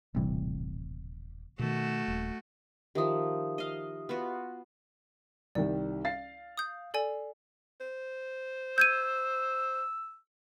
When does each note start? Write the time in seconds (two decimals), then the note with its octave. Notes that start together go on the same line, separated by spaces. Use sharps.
0.15 D#1 A1 C3 E3 G3
1.59 B2 D#3 A3 F#4
2.08 D#1
2.95 D#3 F3 G4 E5 D#6
3.58 D#5 F5
4.09 B3 F4 F#4
5.55 C2 D#3 G3 D5
6.04 F5 A6 C7
6.58 D#6 G6
6.94 A4 D5 G#5
7.81 C5
8.78 E6 G6 G#6 D#7